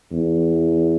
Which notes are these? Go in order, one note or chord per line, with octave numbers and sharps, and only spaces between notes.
E2